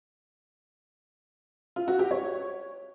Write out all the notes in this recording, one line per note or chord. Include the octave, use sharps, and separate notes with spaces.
F4
F#4
G4
C#5